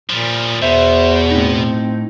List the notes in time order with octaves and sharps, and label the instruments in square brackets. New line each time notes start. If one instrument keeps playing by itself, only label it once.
[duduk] A#2 [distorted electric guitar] F3 G3
[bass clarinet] E2 [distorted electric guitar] B2 [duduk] C5 [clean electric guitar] E5
[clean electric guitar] A2 D#4 [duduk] C4